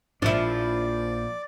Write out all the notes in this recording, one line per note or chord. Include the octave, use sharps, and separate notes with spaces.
A#1 F3 D4 E4 D5